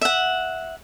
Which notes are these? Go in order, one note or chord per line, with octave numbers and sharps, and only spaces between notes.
E5 F#5